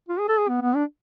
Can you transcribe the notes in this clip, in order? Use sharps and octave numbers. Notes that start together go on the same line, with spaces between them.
F4
G#4
A4
G#4
B3
B3
D4